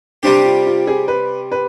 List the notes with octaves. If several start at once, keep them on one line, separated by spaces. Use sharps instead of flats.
C3 G3 C4 D4 G4
F4
F4
G#4
B4
B4